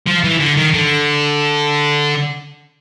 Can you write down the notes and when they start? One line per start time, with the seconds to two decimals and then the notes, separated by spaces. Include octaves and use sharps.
0.07 F3
0.24 E3
0.41 D3
0.57 D#3
0.74 D3